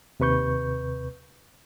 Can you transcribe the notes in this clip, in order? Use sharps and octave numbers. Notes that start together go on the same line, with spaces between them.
D#2 C3 B4 C#6 G6